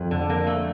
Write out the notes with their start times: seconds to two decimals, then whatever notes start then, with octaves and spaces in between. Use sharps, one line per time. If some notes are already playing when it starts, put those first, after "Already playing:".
Already playing: F2
0.11 D3
0.30 A#3
0.47 A3